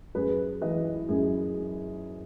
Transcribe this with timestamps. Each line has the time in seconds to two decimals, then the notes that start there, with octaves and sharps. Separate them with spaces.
0.15 F#2 G#4 B4
0.61 E3 B4 D#5
1.09 F#2 G#4